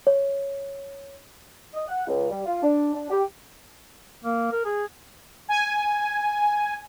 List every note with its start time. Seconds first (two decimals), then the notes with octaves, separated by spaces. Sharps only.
0.07 C#5
1.73 D#5
1.88 F#5
2.07 C#2
2.29 G3
2.45 F4
2.61 D4
2.93 D4
3.10 G4
4.24 A#3
4.52 A#4
4.65 G#4
5.48 G#5